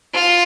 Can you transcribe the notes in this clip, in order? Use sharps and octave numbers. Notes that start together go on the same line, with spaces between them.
F4